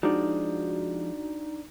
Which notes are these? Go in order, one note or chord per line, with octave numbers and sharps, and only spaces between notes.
F3 G#3 D4 D#4 F#4 D5